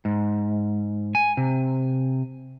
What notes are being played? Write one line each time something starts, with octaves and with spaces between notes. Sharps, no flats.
G#2
G#5
C3